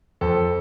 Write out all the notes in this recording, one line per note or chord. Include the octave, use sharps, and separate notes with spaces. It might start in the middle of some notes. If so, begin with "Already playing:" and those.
F2 A4